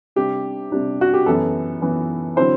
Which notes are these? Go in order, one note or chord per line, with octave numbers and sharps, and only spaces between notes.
C3 G3 D4 G4
C3 G3 D4
F#4
G4
F#2 E3 B3 A4
F#2 E3 B3
D3 F#3 C4 E4 C5